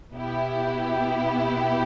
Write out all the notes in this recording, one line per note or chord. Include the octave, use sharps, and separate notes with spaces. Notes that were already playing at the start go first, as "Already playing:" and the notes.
B2 B3 E4 G4